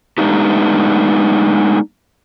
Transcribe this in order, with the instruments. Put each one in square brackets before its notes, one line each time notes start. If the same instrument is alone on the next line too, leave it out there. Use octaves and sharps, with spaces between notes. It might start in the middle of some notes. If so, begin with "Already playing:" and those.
[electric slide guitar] G#3 A3 B3 D4 D#4 G4